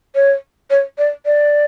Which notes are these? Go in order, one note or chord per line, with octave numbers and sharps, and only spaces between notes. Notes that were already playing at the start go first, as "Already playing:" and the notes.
C#5
C#5
D5
D5